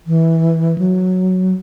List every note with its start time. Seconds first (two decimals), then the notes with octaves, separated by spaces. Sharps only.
0.07 E3
0.78 F#3